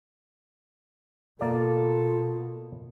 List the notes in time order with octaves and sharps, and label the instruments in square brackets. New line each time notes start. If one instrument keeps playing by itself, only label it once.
[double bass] B2 [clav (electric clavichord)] A#3 D5 [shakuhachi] F4 [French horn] A4